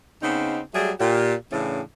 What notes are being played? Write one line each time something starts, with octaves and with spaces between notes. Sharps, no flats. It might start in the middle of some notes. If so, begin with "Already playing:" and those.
C#3 B3 C4 D#4
F#3 G3 A3 G#4
A#2 G4
A2 C#3 E3 C#4 D4